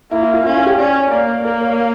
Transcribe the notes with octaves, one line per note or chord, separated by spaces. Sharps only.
A#3 E4
F4
F4
C#4 F4
F4
G4
C#4 D5
C#5
A#3 D5
A#3 A#4
C#5